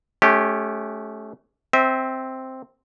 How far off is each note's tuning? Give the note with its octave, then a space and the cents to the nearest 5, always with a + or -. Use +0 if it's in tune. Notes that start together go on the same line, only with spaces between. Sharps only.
A3 -25 C#4 +0 G4 +0
C4 +0 E5 -30